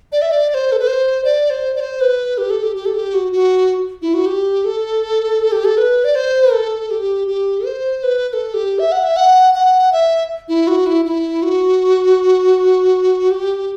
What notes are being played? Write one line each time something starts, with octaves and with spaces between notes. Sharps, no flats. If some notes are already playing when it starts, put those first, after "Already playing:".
D5
E5
D5
D5
C5
A4
B4
C5
D5
C5
D5
C5
B4
G4
A4
G4
G4
A4
G4
F#4
F#4
E4
F#4
G4
A4
G4
A4
B4
D5
C5
A4
G4
G4
C5
B4
B4
A4
G4
E5
F#5
E5
F#5
F#5
E5
E4
F#4
E4
E4
F#4
G4